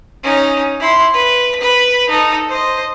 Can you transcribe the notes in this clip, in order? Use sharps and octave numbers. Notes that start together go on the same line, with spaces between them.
C#4 D#4
E4 C6
B4
B4 B5
D#4 A4
C5 D#5